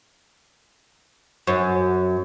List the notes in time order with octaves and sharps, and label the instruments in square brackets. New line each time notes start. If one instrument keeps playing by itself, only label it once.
[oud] F#2